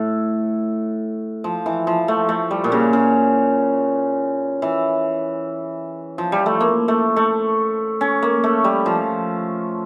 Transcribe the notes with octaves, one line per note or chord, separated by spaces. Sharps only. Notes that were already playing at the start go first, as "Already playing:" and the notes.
Already playing: A2
F3
E3
F3
A3
A3
G3
A#2
C#3
C#3
E3
F3
G3
A3
A#3
A3
A3
C#4
A#3
A3
G3
F3